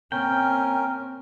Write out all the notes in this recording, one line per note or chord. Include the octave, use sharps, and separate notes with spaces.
A#3 C4 C#4 A#4 G5